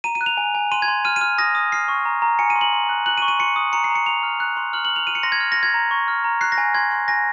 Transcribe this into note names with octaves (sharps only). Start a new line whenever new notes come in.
A#5 D#7
D#7
F#6
F7
G#5
G#5
C6 D#7
G#6
C6
F6 D#7
D#7
F6
D#6 A#6
D#6
F6 C7
C#6
A#5
A#5
G#5 C#7
D#7
C6
F#7
C6
F#6
F#6 F#7
D#7
C#6
D#7
C6 C#7
D#6
A#5 C#7
C7
A#5
C#7
A#5 F7
F6
F#6
C6
F6 F#7
F#7
F6
F7
F6 D#7
C#7
C6 A#6
G#6
F6
A#6
C6
G#6
A#5
C#6
F6
A#5
F#6 C7
A#6
G#5
C6 G#6
C6
G#5 A#6